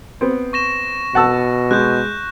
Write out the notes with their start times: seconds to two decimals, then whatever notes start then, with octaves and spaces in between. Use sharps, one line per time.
0.21 B3 C4
0.53 C#6 A#6 E7
1.15 B2 F#5 A5 E6
1.71 G#3 F#6 G6